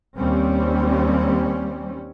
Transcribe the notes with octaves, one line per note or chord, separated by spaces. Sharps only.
D#2 G3 C4 C#4